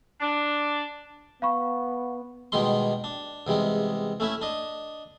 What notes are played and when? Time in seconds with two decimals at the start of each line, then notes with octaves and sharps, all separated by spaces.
0.21 D4
1.42 B3 F5 B5 C#6
2.52 B2 D#3 G3 G#3 D#4 C6
3.04 D4
3.47 E2 C3 G3 G#3
4.20 A3 C#4 E4 E5
4.41 D4 D#5